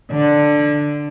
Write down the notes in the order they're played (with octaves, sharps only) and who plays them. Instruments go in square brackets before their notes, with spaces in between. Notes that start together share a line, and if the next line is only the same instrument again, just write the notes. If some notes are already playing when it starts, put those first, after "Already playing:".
[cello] D3